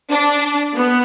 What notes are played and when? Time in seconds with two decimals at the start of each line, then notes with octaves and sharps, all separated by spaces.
0.11 D4
0.75 B3